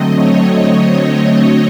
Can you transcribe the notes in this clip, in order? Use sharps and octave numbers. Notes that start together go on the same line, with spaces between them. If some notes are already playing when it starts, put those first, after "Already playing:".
Already playing: D3 F#3 A3 C4 D#5
C#5